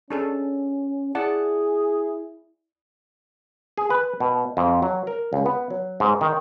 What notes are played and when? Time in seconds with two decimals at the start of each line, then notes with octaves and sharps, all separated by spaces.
0.10 C#4 D4 G#4 A4
1.15 E4 G#4 D5 F#5 A5
3.78 G#4
3.90 B4
4.20 B2
4.57 F2
4.82 F#3
5.07 A#4
5.33 C#2
5.46 B3
5.71 F#3
6.00 G#2
6.21 D#3